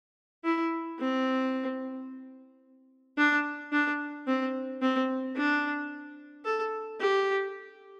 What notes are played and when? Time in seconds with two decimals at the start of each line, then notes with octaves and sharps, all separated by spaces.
0.45 E4
1.00 C4
3.18 D4
3.72 D4
4.27 C4
4.82 C4
5.36 D4
6.45 A4
7.00 G4